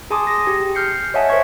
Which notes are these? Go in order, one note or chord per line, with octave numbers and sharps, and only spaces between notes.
G#4 G#5 A5 C6 D6 D#6
A#6
G4
F6 G6 C7 C#7
C#5 D#5 E5 F#5 G#5 A5
A#4 C5 C#5 E5 C#6 G#6